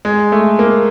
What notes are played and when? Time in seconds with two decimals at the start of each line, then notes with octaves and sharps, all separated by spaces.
0.05 G#3
0.32 A3
0.59 A#3